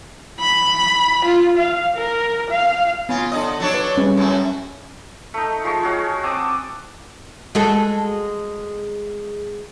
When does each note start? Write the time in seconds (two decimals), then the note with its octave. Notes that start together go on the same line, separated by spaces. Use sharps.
0.40 B5
1.25 F4
1.57 F5
1.96 A#4
2.50 F5
3.09 C#3 B3 F4
3.32 D3 D#5
3.60 F#3 D4 C#5
3.74 B4
3.97 G3 C#4 B4
4.17 F#2 A2 F#3
5.34 A3 D#4
5.64 F3 G#3 C#6
5.83 G#3 C#4 F#4 G#4
6.23 C4 A5 D6 D#6
7.55 G#3 F#4 A4